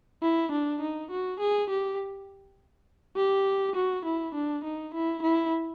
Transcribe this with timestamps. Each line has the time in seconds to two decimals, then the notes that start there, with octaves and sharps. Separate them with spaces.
0.23 E4
0.52 D4
0.82 D#4
1.11 F#4
1.40 G#4
1.70 G4
3.16 G4
3.76 F#4
4.06 E4
4.34 D4
4.64 D#4
4.94 E4
5.23 E4